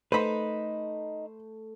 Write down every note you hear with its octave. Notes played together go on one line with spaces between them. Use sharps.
A3 D#4 B4 C5 B5